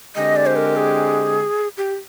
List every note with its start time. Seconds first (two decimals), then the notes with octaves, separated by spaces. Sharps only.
0.16 D3 G#3 C4 G4 D#5
0.36 D5
0.46 C5
0.56 A#4
0.77 G#4
1.78 G4